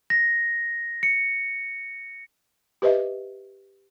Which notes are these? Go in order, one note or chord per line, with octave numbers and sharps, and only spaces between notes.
A#6
C#7
G4 B4 C5 D#5 E5